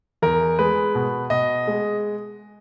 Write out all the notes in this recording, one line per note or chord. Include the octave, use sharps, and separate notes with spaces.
E2 A#4
G#3 B4
B2
B2 D#5
G#3